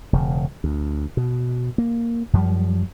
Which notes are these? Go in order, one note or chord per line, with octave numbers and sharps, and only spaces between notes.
E1 C#3
D2
B2
A#3
F#2 F3 G3